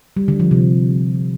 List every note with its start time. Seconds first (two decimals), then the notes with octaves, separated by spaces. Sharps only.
0.17 G3
0.28 D3
0.40 F3
0.51 C3